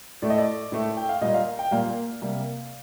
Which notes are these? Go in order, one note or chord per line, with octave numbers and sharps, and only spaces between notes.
A2 A3 D5
D#5
D5
A2 A3
G5
F5
A#2 G3 A#3 D#5
F5
G5
A#2 G3 A#3 F5
C3 G3 A#3